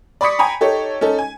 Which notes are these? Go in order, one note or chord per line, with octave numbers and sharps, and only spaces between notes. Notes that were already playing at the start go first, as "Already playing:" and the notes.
D5 B5 C#6 D#6 B6 C#7
G5 G#5 A#5 B5
D#4 G4 A4 C#5
C#4 D#4 A4
G#5